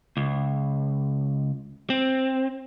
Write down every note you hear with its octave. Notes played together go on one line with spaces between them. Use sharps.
C#2
C4